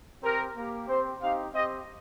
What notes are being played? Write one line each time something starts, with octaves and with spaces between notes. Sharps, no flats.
C4 G4 A#4
A#3 G4
C4 G4 C5
C4 D#4 G4 F5
C4 G4 D#5